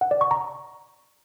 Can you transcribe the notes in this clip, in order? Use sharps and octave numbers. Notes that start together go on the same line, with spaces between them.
F#5
D5
C#6
A#5